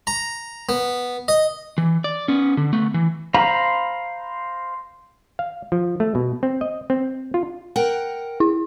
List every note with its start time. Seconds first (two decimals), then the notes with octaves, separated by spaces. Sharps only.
0.07 A#5
0.69 B3
1.28 D#5
1.78 E3
2.04 D5
2.28 B3 C#4
2.57 D3
2.73 A3 B3
2.94 E3
3.34 C5 F5 A#5 B5
5.39 F5
5.72 F3
6.00 A3
6.15 B2
6.43 C4
6.61 D#5
6.90 C4
7.34 F4
7.76 A#4 F#5 G5
8.40 E4